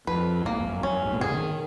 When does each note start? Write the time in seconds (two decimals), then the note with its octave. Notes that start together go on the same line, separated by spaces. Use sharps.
0.07 F2 B4
0.45 G#2 A#3
0.53 F#2
0.60 F2
0.67 F#2
0.83 F#2 C#4
1.05 G#2
1.13 A#2
1.20 B2 G#4
1.27 C#3
1.34 D#3